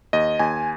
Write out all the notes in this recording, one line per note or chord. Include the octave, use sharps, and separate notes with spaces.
D#2 D#5
D#2 G#5